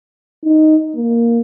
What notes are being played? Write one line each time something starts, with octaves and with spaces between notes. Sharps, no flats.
D#4
A#3